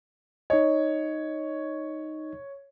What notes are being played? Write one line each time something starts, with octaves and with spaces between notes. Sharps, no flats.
D#4 C#5 D#5